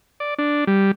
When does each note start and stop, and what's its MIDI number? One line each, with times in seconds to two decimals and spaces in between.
0.20 0.34 74
0.38 0.65 62
0.67 0.91 55